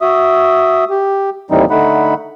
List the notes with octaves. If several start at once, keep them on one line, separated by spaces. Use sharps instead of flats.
F#4 E5 D#6
G4
D#2 A2 E3 G3 C4 D#4
D3 A3 D#4 F#5 B5